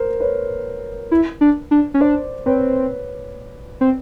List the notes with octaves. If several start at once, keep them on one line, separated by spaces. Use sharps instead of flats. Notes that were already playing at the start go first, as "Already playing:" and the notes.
Already playing: A#4 C5
B4 C#5
E4
D4
D4
C#4
D4 C5 D5
C4 B4 C#5
C4